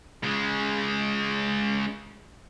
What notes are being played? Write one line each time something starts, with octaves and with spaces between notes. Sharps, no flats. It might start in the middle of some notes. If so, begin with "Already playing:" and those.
C#3 G#3